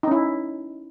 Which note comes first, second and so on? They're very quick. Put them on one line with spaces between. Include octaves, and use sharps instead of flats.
D#4 C#4 E4